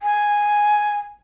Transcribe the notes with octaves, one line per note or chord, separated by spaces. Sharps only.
G#5